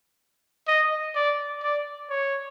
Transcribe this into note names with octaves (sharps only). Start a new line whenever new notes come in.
D#5
D5
D5
C#5